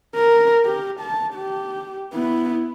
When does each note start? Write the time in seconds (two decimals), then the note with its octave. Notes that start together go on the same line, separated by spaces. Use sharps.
0.16 A#4
0.65 G4
1.01 A5
1.35 G4
2.13 B3 E4